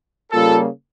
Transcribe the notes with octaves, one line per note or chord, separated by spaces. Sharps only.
C#3 G3 A#3 F4 A4